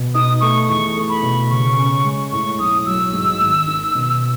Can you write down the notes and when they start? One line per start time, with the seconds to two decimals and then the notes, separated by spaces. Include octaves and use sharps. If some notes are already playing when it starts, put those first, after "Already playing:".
Already playing: B2
0.14 D#4 D#6
0.41 A3 C#6
0.68 E2 C#6
0.96 A3
1.09 B5
1.23 B2
1.51 C#3 C#6
1.77 C#4
2.05 G#3
2.32 A2 C#6
2.59 B1 D#6
2.86 F#3 E6
3.13 G#2
3.40 G#1
3.67 D#3
3.95 B2